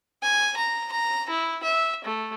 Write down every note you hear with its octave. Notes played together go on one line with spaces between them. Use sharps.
G#5
A#5
A#5
E4
E5
A3